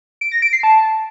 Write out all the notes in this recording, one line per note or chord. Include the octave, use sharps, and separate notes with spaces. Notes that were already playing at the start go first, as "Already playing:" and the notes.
D7
A#6
D7
C7
A5